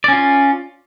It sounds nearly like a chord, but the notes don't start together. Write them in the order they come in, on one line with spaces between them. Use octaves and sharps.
D5 C#4 F4